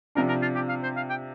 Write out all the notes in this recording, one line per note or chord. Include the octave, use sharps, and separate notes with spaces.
C3 F3 D4 A#4
A#4
F4
G4
F5
C5
F5
G5